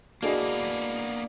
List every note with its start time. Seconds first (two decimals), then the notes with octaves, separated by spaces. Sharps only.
0.23 A#3 B3 D4 E4 F#4 G#4 D#5